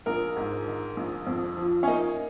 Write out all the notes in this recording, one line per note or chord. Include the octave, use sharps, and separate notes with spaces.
A#1 A#4
G#2
D#3
A#1
F2
F3
C#4
A#3 D#4